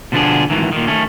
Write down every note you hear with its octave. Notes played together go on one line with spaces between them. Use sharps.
B2 D3 F3 B3 D4 G#4
G#2 D#3 E3
A#2 D#3
D#3 A3 C#4